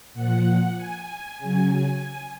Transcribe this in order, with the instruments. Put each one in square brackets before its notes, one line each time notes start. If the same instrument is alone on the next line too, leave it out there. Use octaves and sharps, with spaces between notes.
[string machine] A#2 F3 F#5
G#5
C#3 F#3 G#5